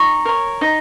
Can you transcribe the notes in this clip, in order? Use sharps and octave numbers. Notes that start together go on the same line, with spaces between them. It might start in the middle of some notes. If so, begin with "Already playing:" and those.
Already playing: D#4 A#5 C#6
A#4 C#5
D#4